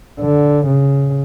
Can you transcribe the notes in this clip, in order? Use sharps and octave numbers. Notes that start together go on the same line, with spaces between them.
D3
C#3